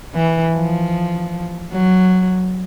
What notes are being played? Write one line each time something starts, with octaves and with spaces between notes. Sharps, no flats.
E3
F3
F#3